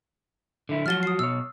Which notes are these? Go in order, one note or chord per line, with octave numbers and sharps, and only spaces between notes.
D3 E4
F3 F#3 F#4 F6 A6 G7
D#6 C7
B2 C#5 E6